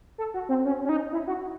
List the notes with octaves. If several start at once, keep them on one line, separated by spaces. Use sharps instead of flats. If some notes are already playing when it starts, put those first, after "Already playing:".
A4
F#4
C4
C#4
C#4
D#4
E4
F#4